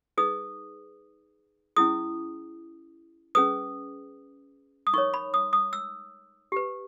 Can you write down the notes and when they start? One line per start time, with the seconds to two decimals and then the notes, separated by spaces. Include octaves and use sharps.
0.18 D#4 G#4 B4 D#6
1.76 C#4 E4 G#4 D#6
3.35 C#4 G#4 B4 D#6
4.87 D#6
4.93 D#4 A#4 C#5 C#6
5.14 B5
5.34 D#6
5.53 D#6
5.73 E6
6.52 G4 B4